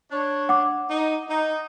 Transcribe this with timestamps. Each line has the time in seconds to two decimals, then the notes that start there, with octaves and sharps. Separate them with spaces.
0.11 D4 C#5
0.49 F#5 D6
0.89 D#4
1.27 D#4